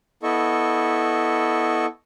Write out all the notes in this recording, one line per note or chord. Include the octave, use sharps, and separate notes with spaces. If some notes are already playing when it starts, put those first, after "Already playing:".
B3 E4 A4 D#5 C#6